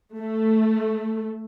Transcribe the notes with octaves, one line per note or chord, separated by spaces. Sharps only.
A3